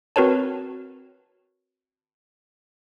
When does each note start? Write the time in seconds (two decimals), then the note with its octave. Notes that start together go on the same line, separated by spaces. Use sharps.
0.16 C4 F#4 A#4 B4 C#5 A5